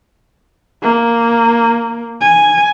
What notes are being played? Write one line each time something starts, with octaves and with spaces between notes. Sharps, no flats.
A#3
G#5